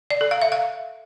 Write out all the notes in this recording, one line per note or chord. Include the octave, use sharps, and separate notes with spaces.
D5
A4
F5
E5
F5